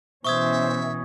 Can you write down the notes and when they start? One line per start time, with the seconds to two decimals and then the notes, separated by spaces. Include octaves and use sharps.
0.25 B2 E3 C#4 C5 E5 C#6 D#6 G#6